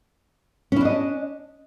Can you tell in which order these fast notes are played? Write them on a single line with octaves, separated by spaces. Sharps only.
C#4 E4 D4 D#5